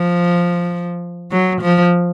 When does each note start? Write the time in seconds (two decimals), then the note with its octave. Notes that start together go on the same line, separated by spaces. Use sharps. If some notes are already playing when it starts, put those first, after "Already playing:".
Already playing: F3
1.32 F#3
1.61 F3